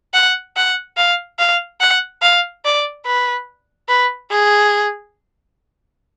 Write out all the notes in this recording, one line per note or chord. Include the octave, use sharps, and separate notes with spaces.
F#5
F#5
F5
F5
F#5
F5
D5
B4
B4
G#4